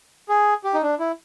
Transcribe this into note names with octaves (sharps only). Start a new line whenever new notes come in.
G#4
G4
D#4
D4
E4